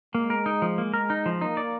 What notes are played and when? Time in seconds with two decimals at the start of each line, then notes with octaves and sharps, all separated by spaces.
0.14 G#3 A#3
0.30 A#4
0.46 D#4
0.62 F3
0.78 A#3
0.94 A#4
1.10 D#4
1.26 F3
1.41 A#3 D#4
1.57 D5